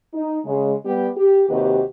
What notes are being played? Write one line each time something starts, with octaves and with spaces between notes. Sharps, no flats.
D#4
C#3 G#3
G3 B3 G4
G4
D#2 C3 F#4 G4 B4 D#5